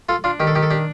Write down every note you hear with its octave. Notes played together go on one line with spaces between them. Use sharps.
F4 A4
D4 F4
D#3 G4
A4
D#3 G4
A4
D4 G4